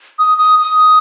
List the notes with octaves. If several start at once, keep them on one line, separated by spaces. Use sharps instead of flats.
D#6
D#6
D#6